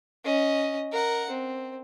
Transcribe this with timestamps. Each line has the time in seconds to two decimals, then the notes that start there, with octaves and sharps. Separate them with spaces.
0.24 C#4 D#5
0.93 A#4 F#5
1.30 C4